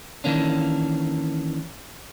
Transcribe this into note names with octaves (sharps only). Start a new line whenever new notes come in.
D#3 E3 A#3 C#4 D4